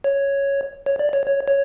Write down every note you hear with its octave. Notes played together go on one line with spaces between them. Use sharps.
C#5
C#5
D5
C#5
C#5
C#5